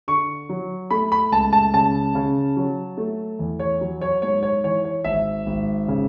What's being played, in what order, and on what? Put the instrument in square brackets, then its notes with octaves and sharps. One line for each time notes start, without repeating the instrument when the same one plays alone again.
[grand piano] D3 C#6
F#3
A3 B5
B5
C#2 A5
A5
C#3 A5
C#3
F#3
A3
E2
C#5
F#3
C#5
G#2 C#5
C#5
E3 C#5
C#5
G#1 E5
G#1
C#3